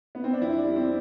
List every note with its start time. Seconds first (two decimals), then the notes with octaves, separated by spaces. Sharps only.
0.15 B3
0.24 C4
0.33 D4
0.41 F2 E4
0.58 D4
0.64 G3
0.76 C4